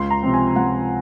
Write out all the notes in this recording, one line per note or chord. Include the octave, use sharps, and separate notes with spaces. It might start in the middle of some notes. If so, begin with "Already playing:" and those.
Already playing: C#2 C6
A#5
C3 F3 C4
G#5
C#2 F#5